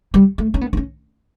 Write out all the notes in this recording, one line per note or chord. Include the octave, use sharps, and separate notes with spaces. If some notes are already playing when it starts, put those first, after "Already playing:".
G3
A3
C#4
B3
D4
C#4